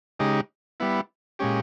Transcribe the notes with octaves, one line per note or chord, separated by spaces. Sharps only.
C#3 G#3 D#4 G4
G3 B3 E4
A#2 G#3 C#4 G4